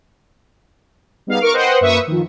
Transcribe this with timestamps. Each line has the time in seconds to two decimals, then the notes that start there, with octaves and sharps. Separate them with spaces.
1.27 G3 B3 D#4 G#4 F5
1.41 A#4 C#6 D6 F6
1.53 B4 C5 D#5 F#5 G5 C6
1.81 F#2 A#3 B4 E5 C#6 D#6
2.07 D#3 F3